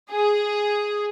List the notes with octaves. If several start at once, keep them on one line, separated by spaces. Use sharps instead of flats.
G#4